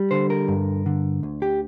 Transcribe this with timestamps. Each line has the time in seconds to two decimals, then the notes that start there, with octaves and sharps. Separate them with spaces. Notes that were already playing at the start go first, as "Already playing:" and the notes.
Already playing: G3
0.11 D3 C5
0.30 A#4
0.48 G2
0.86 D3
1.23 D2
1.42 G4